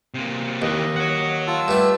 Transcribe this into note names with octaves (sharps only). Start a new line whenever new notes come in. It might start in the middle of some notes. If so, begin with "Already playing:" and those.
C3 A#3
D#2 E3 D#4 D#5
C#5 F#5
F4 A5 E6
G2 A3